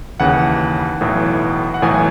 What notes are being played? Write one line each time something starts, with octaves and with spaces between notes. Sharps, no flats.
D#2 C#3 E3 F#5
B1 A2 E3
F#5
B1 A2 E3 G#5